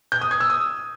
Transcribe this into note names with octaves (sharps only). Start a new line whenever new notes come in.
G6
D#6
G#6
E6
D#6